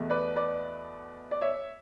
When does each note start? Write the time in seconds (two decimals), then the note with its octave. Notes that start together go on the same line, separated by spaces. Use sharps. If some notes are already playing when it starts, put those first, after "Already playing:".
Already playing: E2 B2 A3
0.10 B4 D5
0.36 B4 D5
1.31 D5
1.41 C#5 E5